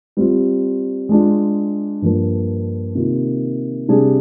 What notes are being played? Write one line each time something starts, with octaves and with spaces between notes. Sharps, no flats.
G3 C4 F4
G#3 D4 F4
G2 F3 A#3 D4
C3 D#3 A#3 F4
C3 G3 D4 G#4